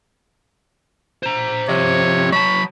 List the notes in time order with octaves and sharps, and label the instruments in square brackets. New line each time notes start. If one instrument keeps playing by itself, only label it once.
[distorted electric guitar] C5 A#5
[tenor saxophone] C3 [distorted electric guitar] F3 D#5 [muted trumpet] C#5
[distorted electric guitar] F#3 A5 [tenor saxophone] C#5 [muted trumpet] B5